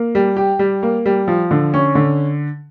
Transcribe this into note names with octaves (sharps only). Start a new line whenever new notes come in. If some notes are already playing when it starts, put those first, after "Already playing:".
Already playing: A#3
G3
G4
G3
A#3
G3
F3
D3
C#4
D3